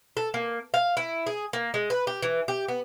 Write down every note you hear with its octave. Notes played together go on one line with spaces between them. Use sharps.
A4
A#3
F5
E4
G#4
A#3
G#3
B4
G4
E3
G4
B3